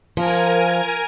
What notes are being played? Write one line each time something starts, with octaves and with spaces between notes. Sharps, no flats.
F3 A#4 G#5